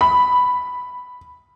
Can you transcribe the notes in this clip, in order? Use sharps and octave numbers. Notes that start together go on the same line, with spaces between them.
B5